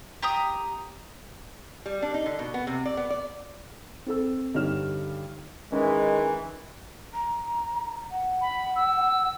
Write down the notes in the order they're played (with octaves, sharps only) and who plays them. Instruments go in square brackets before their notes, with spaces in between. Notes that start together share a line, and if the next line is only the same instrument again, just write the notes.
[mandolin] G4 A#5 D#6
[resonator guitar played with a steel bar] G3
D4
D#4
D3
B2
B3
C3
D5
B3
D5
[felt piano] C4 A4 E6
G2 D3 D#4 C#5 F6 E7
[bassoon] D#3 [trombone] E3 [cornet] G#3 [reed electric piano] C#4
[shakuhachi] A#5
F#5
[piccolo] B5
E6